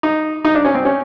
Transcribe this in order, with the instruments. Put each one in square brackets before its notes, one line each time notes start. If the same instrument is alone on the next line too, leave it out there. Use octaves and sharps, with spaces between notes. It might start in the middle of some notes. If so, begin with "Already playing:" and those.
[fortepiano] D#4
D#4
D4
C#4
C4
C#4